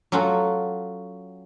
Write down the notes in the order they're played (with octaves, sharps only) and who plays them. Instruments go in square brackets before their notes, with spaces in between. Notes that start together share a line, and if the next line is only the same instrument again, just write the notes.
[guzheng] F#3 C#4 F4 A4 F#5